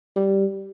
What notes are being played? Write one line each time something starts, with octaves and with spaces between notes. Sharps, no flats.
G3